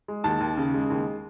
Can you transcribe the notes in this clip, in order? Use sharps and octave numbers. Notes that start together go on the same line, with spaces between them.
G#3
D#2 A5
D#2
C#3
G#3
D#2